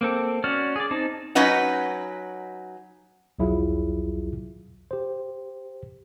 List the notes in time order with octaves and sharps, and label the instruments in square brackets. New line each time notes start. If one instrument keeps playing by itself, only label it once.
[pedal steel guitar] A#3 C4 A4
C#4 F#4 D5 F6
G#4 D5
C4 D#4 A5
[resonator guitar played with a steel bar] F#3 C#4 D#4 B4 D#5 F#5
[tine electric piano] B1 E2 F#3 E4 F4 G#4
G4 C5